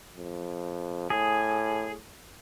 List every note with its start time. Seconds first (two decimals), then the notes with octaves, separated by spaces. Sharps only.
0.16 F2
1.10 A2 G#4